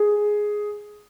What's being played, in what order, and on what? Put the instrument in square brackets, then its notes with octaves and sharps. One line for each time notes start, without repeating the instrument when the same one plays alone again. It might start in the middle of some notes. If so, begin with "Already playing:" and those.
Already playing: [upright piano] G#4